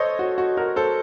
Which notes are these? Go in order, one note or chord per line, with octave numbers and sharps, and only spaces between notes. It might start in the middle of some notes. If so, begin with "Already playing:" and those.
Already playing: A4 C5 C#5 D#5
F#4
F#4
F#4 A#4
A4 C5